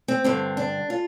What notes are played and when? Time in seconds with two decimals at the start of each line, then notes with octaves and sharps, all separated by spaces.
0.08 C4
0.24 G2 D3 C4
0.57 D4
0.90 F4